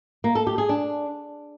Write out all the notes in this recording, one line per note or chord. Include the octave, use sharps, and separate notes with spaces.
A#3
A4
G4
G#4
D4